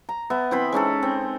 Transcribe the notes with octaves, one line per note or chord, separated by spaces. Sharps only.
A#5
B3 E5
E3 C4 C5 B5
G#3 C#4 D#4 A4
C4